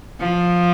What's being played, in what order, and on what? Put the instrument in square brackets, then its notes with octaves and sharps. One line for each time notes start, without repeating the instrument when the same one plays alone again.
[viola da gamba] F3